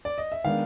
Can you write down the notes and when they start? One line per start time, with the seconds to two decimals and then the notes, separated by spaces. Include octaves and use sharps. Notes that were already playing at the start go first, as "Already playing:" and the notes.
0.05 D5
0.18 D#5
0.32 E5
0.45 D#3 G#3 B3 D4 F5